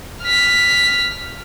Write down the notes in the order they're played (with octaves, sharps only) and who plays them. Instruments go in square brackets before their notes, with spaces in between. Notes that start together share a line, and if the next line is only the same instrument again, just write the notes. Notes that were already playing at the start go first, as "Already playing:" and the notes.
[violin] F6 B6